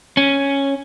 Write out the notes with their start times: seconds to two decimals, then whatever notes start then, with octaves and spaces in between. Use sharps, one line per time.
0.17 C#4